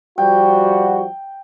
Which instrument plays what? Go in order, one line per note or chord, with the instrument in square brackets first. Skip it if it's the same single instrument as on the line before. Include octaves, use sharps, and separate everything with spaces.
[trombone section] F3 G3 F#4 [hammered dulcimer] G5